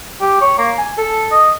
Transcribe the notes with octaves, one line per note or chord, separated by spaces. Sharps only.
G4
C#5
A#3
G#5
A4
D#5